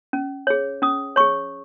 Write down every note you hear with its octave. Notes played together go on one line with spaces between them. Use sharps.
C#4
G#4 C#5
C#4 D#6
G#4 C#5 C#6